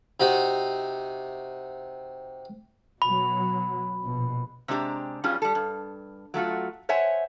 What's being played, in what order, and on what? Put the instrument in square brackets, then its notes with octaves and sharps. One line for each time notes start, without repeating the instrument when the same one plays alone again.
[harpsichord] C3 D#4 F#4
[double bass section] B2 F#3 [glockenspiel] B5
[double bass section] A#1 B2
[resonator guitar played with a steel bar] C3 G#3 D4 G4 A#5
G2 F#3 G3 C#4 F4 G#4
G3 A4
G2
F#3 A3 F4 F#4
C5 C#5 E5 F#5 G#5